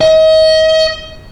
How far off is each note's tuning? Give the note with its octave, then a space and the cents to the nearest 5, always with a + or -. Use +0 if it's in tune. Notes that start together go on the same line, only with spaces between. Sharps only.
D#5 +35